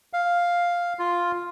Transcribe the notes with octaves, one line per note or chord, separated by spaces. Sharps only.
F5
F4